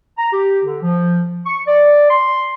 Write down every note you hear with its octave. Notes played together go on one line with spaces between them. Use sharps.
A#5
G4
D3
F3
C#6
D5
C6